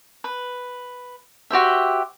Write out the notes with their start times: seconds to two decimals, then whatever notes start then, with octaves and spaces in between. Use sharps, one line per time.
0.24 B4
1.50 F#4 G4 C5 E5